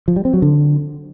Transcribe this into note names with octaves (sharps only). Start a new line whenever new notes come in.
F3
G3
C4
F#3
D3